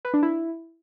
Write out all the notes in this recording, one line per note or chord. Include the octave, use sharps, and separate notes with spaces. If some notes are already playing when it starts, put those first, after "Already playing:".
B4
D4
E4